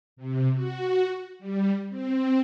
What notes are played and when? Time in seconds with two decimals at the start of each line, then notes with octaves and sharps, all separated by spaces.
0.17 C3
0.53 F#4
1.39 G3
1.89 C4